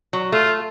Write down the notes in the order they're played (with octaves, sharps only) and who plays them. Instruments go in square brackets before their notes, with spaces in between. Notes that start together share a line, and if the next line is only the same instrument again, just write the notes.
[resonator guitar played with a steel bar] F#3
[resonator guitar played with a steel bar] A3 [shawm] F4